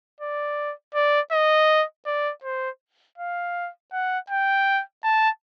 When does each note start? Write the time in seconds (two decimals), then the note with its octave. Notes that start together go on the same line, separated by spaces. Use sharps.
0.21 D5
0.94 D5
1.32 D#5
2.06 D5
2.44 C5
3.18 F5
3.93 F#5
4.30 G5
5.04 A5